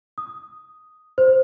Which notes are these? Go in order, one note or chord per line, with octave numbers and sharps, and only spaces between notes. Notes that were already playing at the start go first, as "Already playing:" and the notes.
D#6
C5